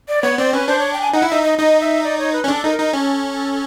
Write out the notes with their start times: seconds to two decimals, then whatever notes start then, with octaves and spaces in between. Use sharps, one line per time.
0.08 D5
0.23 B3 C#5
0.38 C4 D5
0.53 C#4 B4
0.68 D4 C5
0.79 C#5
0.93 G5
1.01 G#5
1.13 D#4 F#5
1.22 E4
1.29 D#4 E5
1.43 D#5
1.58 D#4 D#5
1.81 E5
2.04 D5
2.19 C#5
2.33 B4
2.44 C#4
2.48 D4 A4
2.63 D#4 B4
2.71 A#4
2.78 D#4
2.93 C#4 A4